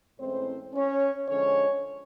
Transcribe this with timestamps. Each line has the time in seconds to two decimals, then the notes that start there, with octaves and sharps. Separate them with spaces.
0.19 A2 E3 G#3 C4 C#4 C5
0.74 C#4 C#5
1.28 D3 F3 G#3 C#4 C#5